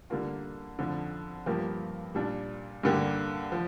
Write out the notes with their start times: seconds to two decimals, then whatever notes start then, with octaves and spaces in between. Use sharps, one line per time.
0.10 D3 G3 A#3 F4
0.79 F2 D3 F3
1.46 G2 F3 A#3 G4
2.15 A#2 G3 D4
2.83 G2 D3 A#3 G4
3.52 F3